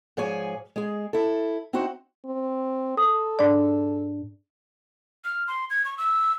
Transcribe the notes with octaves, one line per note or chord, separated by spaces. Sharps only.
G#2 F3 G#4 C#5 G#5
G#3 G#4
E4 A4
C4 D#4 E4 F#4 C5
C4
A4 D#6
G#2 D4 D5
F6
C6
G#6
C#6
E6